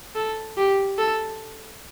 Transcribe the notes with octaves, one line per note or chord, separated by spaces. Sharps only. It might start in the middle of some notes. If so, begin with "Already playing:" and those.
A4
G4
A4